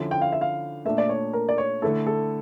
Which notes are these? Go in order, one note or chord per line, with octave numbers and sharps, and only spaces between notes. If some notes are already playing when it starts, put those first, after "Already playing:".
Already playing: D3 F3 C#4 E4
G5
F5
E5
F5
A#2 A3 D4 E5
D5
C#5
A#4
D5
C#5
D3 A3 E4 A4
A4